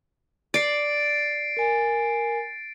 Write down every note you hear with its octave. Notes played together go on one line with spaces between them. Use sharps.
D5 A6 C7 D7
A#4 G#5